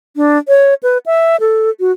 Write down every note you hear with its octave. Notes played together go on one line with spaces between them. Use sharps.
D4
C#5
B4
E5
A4
F#4